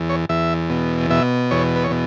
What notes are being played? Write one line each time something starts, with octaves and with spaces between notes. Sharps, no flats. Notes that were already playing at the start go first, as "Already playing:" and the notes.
Already playing: E2
C#5
E2 E5
B2
B2 E5
E2 C#5
B4
C#5
B2